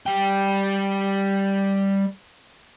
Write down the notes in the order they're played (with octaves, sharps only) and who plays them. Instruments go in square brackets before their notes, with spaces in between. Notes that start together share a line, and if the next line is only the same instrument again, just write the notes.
[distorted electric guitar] G3 G5